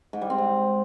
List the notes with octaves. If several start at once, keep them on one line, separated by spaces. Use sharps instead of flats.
G#2
G3
C4
G#2